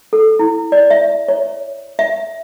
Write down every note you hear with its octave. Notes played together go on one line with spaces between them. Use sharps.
A4
E4
D5
E5
C#5
E5